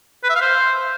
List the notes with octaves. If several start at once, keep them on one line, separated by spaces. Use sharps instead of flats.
B4
E5
F5
C5